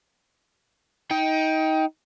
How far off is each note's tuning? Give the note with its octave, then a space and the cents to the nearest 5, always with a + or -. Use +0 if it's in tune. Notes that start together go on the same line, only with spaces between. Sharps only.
D#4 +25 G5 -5